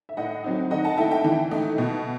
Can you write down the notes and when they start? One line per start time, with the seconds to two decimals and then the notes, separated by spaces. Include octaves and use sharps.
0.09 E5
0.17 A2 D#5 F#5
0.44 F#3 C4 D#4
0.71 D#3 D#5 F#5
0.84 F#5 A5
0.97 A3 E4 E5 G5
1.11 E5 G5
1.24 E3
1.51 A3 D#4
1.78 B2